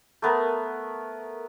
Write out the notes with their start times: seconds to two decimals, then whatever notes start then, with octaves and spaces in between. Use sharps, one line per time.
0.22 A3 B3 A#4